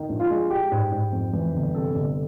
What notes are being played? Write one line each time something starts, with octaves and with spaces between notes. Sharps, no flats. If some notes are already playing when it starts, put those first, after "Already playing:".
Already playing: D#3
A#1
F4
G#3
G#3 G4
G#2
G#2
F2
E3
G1
C3 A4
G1